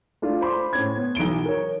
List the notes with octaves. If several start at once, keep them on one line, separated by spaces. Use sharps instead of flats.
A3 D4 F4
C5 B5 C6 D6
A2 C#4 G#6
B3
B1 E3 D7 G7
A#4 C#5